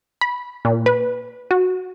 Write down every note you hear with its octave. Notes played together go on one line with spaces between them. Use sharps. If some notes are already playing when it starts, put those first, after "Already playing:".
B5
A#2
B4
F#4